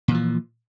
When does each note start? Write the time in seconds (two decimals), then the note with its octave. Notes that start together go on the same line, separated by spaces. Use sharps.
0.08 A#2
0.11 E3
0.14 F3